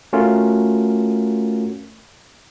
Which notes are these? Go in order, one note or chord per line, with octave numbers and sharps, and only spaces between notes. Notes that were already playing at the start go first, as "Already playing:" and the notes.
A3 C#4 F4 F#4 A#4